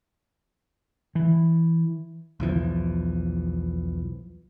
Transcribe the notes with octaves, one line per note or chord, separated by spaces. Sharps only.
E3
B1 E2 E3 F3